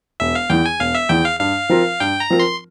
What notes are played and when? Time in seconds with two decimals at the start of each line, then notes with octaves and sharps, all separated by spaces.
0.20 E1 E5
0.35 F5
0.50 E2 E3 G5
0.65 G#5
0.80 E1 F5
0.95 E5
1.09 E2 E3 G5
1.25 F5
1.40 G2 F5
1.69 F3 C4 F4 A#4
2.00 G2 G5
2.20 A#5
2.30 F3 C4 F4 A#4
2.40 C6